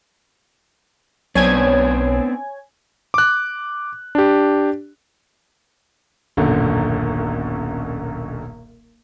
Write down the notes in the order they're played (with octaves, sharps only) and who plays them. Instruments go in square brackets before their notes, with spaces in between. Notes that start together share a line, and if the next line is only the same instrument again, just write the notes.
[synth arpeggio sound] B1 [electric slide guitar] B3 C4 D4 [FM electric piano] C#5 G#5 G#6
[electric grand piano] D6 F#6
D4 G4
[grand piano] D#1 B1 F#2 D3